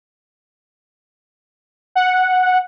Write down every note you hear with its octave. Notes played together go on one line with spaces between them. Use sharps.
F#5